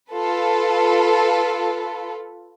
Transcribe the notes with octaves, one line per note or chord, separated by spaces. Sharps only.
F4 A4 B4